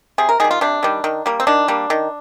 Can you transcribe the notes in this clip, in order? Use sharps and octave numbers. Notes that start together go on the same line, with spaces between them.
C3 G#4
A#4
D#3 G3 G#4
F4
C3 D4
D#3 G3
D#3
G3 A#3
C4
D#3 D4
G3 A#3
D#3